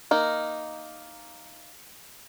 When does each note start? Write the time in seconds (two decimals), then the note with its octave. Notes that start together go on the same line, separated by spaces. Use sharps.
0.11 A#3 D#4